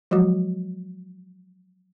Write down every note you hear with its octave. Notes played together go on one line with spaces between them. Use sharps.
F3 F#3 G#3 F#4